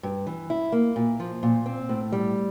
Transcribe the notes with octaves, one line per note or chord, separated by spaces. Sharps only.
G2
E3
E4
A#3
A#2
F3
A#2
C4
A2
G3